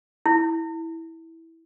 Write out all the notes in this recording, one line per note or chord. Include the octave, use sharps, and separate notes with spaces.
E4